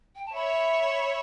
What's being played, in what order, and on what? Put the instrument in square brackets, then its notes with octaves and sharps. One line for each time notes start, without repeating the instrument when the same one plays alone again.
[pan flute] G5
A5
[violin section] C#5 E5 [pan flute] B5